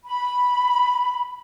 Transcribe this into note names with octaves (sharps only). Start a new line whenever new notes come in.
B5